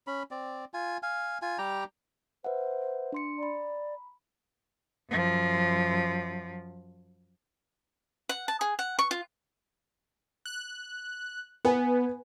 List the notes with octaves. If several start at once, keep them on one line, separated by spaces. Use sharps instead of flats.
C#4 B5
C4 D5
F4 G#5
F5 G#5
F4 G#5
G3 G4 G5 A#5
B4 C5 E5 F#5
D4 C6 C#7
D5 A#5 B5
F#2 F3
F#5
A5
G#4
F#5
C#6
F4
F#6
B3 B4 G#5